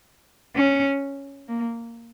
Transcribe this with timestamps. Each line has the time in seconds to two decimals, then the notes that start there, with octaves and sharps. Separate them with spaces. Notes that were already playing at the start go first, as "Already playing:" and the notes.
0.55 C#4
1.48 A#3